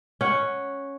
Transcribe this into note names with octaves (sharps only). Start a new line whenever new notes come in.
C#4 F#5